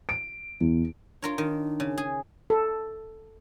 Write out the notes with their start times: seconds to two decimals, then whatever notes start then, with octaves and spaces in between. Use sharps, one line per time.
0.09 D7
0.61 E2
1.22 D4 F4 A#4 C#5
1.38 D#3 D4
1.80 C#3
1.98 G#4
2.50 A4